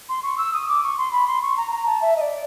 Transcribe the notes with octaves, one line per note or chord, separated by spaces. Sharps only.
C6
C#6
E6
D#6
D6
C#6
C6
B5
C6
C#6
A#5
A#5
A5
E5
D#5
D5